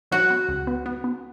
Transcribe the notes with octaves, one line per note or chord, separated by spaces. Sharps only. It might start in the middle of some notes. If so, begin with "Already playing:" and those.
F#3 F#4
B3
C#2
B3
B3
B3